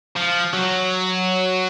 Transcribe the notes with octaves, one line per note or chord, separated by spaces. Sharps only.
F3
F#3